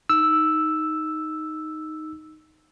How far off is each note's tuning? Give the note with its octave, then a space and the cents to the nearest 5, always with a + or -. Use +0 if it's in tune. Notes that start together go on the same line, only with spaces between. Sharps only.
D#4 +0 E6 +0